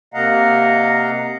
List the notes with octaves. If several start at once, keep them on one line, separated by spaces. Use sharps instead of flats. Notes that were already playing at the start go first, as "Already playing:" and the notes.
C3 A#3 D#5 F5 F#5 A#5